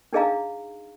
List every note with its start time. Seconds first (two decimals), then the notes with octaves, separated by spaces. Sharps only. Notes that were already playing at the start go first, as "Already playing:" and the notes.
0.13 D4 D#4 G#4 D#5 F5 A#5